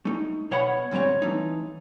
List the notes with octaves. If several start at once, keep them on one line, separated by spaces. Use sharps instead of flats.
A3 D#4
B2 C#5 F#5 B5
D2 G#2 G3 C4 C#5
E3 A3 D#4